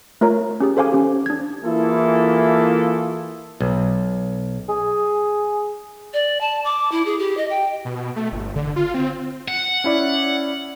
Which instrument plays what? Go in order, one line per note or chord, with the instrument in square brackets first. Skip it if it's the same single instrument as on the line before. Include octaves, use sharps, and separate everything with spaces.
[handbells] A3 F4 A#4 C#5 A#5
C#4 G4 G#4
A4 C5 F5 G#5 D6
C#4 G4
D4 G#6
[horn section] E3 A#3 E4 F4 G#4 A4
[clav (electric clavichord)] B1
[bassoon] G#4
[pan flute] D5
A5
D6
E4
G#4
G4
D#5
G5
[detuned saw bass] B2
A3
G1
D3
F4
C4
[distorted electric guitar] F#5
[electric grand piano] C#4 E4 D5